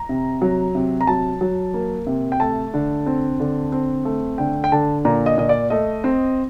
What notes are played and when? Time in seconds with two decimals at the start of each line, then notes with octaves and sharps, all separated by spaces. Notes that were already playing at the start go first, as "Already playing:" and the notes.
Already playing: A#5
0.09 C3
0.42 F#3
0.75 C3
1.01 A#5
1.07 F#3 A5
1.41 F#3
1.74 A#3
2.07 C3
2.32 G5
2.40 A3 A5
2.74 D3
3.06 C4
3.40 D3
3.72 C4
4.05 A3
4.38 D3 G5
4.64 G5
4.72 D3 A5
5.05 A#2 A#5
5.26 D#5
5.38 A#2 D#5
5.49 D5
5.70 A3 D#5
6.04 C4